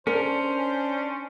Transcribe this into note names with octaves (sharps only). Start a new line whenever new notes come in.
C#4 D4 A#4 C5